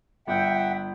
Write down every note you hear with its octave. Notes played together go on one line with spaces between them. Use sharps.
G1 E5 F#5 G5